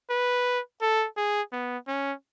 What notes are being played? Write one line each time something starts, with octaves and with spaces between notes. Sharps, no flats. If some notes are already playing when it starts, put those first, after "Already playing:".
B4
A4
G#4
B3
C#4